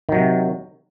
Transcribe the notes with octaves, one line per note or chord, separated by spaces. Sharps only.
C3 D#3 F#3